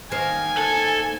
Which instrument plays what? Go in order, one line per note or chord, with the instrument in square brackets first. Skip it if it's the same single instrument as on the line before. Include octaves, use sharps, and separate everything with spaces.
[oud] D#3 A#3 C5 [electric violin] G#5
[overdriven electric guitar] A4